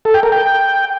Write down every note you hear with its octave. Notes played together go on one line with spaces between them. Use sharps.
A4
G5
A#4
G5